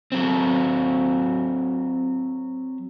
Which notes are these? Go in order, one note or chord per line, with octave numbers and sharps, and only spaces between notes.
F#3 C4